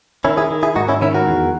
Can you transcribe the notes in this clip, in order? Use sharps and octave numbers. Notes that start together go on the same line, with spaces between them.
D#3 C#4 E4
E4 G#4
D#3
E4 G#4
G#2 D#4 F#4
C#4 E4
D#3 C#4 E4
F#4 A#4
E2